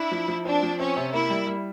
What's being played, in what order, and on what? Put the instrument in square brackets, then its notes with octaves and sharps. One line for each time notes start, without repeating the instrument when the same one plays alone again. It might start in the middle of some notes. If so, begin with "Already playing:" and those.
Already playing: [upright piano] D4 [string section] E4
[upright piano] F3
F3
[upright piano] C4 [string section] D4
[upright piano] F3
[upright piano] C4 [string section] C#4
[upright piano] C3
[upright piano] A#3 [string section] E4
[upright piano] G3
G3